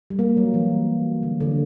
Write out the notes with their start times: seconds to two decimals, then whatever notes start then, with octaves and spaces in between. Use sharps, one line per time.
0.10 G3
0.19 A#3
0.37 F#3
0.54 E3
1.23 D3
1.40 D3